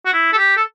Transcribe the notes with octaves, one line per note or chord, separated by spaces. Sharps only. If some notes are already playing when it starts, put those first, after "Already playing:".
F#4
E4
A4
G4
A4